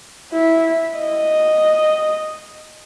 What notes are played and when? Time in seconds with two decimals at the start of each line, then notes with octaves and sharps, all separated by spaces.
0.33 E4
0.98 D#5